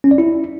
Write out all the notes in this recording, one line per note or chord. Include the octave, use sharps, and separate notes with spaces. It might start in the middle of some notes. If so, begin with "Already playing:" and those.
C#4
D5
E4